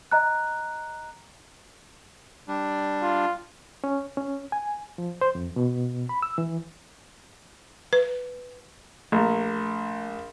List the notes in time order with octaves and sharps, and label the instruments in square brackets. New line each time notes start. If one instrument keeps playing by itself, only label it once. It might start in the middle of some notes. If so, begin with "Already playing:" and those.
[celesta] D#5 A#5 F#6
[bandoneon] G3 D4
[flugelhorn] F4
[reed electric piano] C#4
C#4
G#5
F3
C5
F2
B2
B5
E6
E3
[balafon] B4
[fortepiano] A#1 [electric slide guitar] A3 A#5